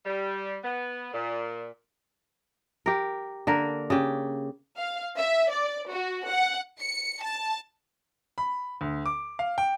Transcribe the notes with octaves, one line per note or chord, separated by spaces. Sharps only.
G3
B3
A#2
G4 A#4
D3 A#3 A#4
C#3 G4
F5
E5
D5
F#4
F#5
C#7
A5
B5
D2
D6
F5
G5